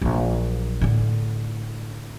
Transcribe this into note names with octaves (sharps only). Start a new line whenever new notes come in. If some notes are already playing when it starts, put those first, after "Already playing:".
A#1 F#3
A2 D3